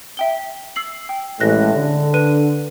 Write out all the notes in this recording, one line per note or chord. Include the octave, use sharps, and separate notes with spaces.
E5 G5 G7
E6 C7 F#7
G5
A1 A2 G#3 F#6 A#6
D3
B4 D#7